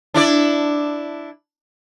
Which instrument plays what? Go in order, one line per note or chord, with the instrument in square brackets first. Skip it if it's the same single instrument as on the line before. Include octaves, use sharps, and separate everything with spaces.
[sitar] D4 E4 D5